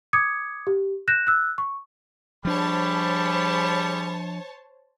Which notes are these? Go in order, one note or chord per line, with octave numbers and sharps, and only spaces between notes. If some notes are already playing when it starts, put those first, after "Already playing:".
D6 D#6 G#6 C#7
G4
F#6 G6 A#6 E7
E6 F#6
C#6
F3 G3 D4 G#4 C5 C#5 A5 B5